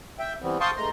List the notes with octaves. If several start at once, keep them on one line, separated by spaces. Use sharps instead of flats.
E5 G5
E3 G3 B3 C4
F5 G5 A5 C6 C#6 D#6
G2 G#3 A3 A#5 C6